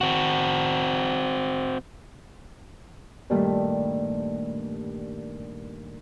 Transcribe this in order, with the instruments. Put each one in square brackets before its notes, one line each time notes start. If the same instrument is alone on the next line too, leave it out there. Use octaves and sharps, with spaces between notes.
[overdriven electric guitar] C4 F#4
[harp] G2 A#2 D#3 G3 A3